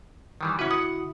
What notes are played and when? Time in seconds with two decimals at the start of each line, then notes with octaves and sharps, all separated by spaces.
0.41 D#3 E3 G3
0.59 D3 C#4 E4 F#4 B4
0.71 F#5 D#6